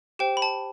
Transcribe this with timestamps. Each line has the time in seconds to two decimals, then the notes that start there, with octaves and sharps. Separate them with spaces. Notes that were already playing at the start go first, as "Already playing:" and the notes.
0.19 G4 C5 G5
0.37 B5
0.42 A5